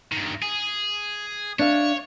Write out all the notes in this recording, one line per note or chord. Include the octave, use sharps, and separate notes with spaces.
G2 D#3
G#4
D4 C#5 E5 F5